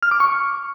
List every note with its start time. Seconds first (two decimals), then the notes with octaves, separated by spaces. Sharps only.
0.03 F6
0.11 D6
0.20 C#6